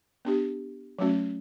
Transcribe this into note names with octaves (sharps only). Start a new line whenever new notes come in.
B3 D4 G4
F#3 A3 C#4 F#4